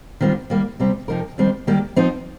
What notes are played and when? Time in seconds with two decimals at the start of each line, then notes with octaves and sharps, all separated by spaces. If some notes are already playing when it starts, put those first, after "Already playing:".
0.20 D#2 D#3 G3 C4 F4
0.50 D#3 G3 A#3
0.80 C3 G3 C4
1.08 F2 C3 F3 D#4 A#4
1.38 F2 D#3 G3 C4
1.67 D#3 G3 A#3 G4
1.96 F3 C4 D#4 C5